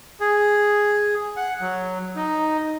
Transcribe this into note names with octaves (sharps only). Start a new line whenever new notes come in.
G#4
F#5
F#3
D#4